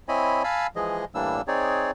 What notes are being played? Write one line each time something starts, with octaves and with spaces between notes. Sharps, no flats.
C4 E4 C#5 D#5 G#5 B5
F5 G#5 A5 B5 E6
E3 F3 G#3 G#4 D#5
A2 E3 G3 A#3 D4 E6
C4 D#4 G#4 C#5 D5